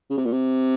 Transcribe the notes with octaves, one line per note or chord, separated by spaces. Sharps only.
C#3
C3
A#2
C3